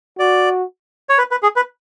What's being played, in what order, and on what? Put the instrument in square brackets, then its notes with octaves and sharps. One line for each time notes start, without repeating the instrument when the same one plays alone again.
[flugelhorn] F#4 [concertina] D5
[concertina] C#5
B4
B4
G#4
B4